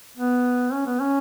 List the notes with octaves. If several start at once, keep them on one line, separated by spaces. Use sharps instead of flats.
B3
C#4
B3
C#4